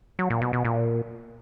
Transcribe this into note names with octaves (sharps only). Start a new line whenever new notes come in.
F#3
A#2
B2
B2
A#2